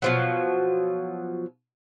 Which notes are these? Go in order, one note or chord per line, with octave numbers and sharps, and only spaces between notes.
B2 F3 F#3